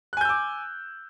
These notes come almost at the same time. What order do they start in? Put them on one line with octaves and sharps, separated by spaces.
F#6 G#5 G6 E6 D6